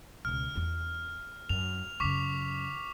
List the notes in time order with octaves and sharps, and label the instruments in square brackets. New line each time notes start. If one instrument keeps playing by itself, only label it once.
[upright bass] C#2 B2 [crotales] F6
[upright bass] E2 F4
[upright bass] F#2 [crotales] F7
[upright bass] F#2 C#3 [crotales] C#6 D6 B6